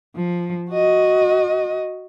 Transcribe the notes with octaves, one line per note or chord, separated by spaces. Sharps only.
F3
F#4 D#5